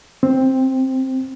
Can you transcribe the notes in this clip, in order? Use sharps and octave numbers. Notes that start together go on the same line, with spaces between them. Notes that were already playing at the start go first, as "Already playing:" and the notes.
C4